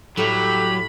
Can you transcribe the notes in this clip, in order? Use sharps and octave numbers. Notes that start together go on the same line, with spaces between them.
A2 F#3 G3 A3 G4 B5